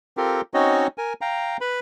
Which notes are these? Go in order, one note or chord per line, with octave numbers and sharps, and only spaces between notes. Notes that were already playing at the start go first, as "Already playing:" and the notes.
C4 F4 G4 A4 A#4
C4 C#4 D#4 F#4 C#5 D#5
A#4 G#5
F5 G5 A#5
B4 B5